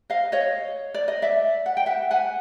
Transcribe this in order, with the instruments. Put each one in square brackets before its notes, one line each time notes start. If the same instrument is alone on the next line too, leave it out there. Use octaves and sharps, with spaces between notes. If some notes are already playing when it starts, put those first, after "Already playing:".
[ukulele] D#5 F5
C#5 D#5
D5
D#5
D5 E5
F#5
G5
E5 F#5
F#5 G#5